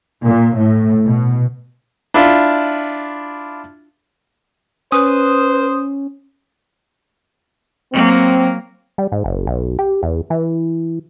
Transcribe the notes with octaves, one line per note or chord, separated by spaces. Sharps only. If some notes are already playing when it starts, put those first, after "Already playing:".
A#2
A2
B2
D4 E4 F4
C#4 B4 C5 D#6
F#3 A#3 C4
G3
G#2
F#1
B1
G4
E2
E3